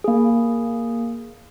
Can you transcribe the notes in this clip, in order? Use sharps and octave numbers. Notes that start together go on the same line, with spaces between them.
A#3 G#4